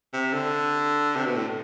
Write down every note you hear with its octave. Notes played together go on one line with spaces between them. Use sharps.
C3
D3
C3
B2
A2